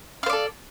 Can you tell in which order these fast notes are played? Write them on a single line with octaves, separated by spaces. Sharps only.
F5 C5 D5 A4